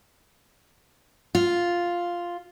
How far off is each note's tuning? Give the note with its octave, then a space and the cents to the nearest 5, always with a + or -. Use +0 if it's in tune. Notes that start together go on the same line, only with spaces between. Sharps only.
F4 +0